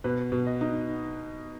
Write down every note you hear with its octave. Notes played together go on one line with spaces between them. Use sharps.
B2 B4
B2
D#5
D#4